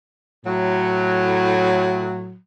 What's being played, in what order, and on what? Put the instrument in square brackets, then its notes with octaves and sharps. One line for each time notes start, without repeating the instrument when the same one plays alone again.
[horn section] A2 F#3